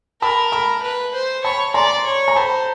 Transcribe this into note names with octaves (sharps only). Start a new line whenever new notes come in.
A#4 A5 B5
A5 B5
B4
C5
C#5 A5 B5
D5 A#5 C6
C#5
A#5
C5 A5 B5